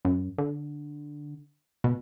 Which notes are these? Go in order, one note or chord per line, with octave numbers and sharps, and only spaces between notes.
F#2
D3
B2